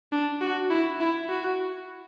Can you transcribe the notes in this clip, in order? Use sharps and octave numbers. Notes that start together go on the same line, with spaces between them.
D4
F#4
E4
E4
F#4